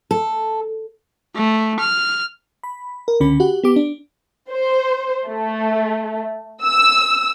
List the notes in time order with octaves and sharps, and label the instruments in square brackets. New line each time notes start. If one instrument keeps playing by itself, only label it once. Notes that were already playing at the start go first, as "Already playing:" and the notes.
[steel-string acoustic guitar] A4
[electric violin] A3
F6
[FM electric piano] B5
A#4
C#2 D3 C#4 B5
F#4 G4 F#5
B3 G4 D6
D4
[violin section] C5
A3
E6